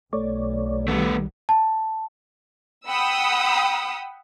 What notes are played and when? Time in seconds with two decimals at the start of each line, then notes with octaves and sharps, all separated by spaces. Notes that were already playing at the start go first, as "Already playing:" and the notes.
0.13 B1 A3 C#5 D5
0.88 D#3 G3 A3 B3
1.49 A5
2.88 F#5 G5 B5 D#6 E6